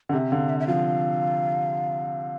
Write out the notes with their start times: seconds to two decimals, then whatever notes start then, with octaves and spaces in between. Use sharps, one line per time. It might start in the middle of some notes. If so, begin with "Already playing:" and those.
0.09 D3
0.13 C3 E5
0.31 D3 F5
0.49 E5
0.60 E5
0.67 F3 F5